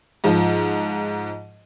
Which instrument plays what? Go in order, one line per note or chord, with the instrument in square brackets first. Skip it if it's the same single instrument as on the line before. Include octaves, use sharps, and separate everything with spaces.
[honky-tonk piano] G#2 F3